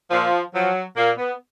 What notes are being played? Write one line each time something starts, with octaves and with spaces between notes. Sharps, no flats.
A#2 F3
F3 F#3
A#2 A#3
B3